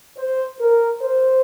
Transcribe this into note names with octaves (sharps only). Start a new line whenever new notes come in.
C5
A#4
C5